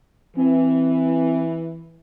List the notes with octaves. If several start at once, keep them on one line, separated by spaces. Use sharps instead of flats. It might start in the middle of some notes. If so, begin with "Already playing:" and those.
E3 C4